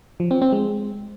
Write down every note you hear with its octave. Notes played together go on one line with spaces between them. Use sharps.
F3
C4
C4
G#3